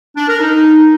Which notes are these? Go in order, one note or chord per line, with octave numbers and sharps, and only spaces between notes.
D4
A#4
D#4